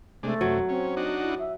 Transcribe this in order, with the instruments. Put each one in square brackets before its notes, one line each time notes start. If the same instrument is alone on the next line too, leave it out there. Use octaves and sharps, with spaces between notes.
[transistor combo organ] C3 G#3 D4 [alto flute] A3
[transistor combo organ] F#2 C3 [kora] F#3
[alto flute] C4 [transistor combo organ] C#4
[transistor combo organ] D4 D#4 F#4
[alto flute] E4
E5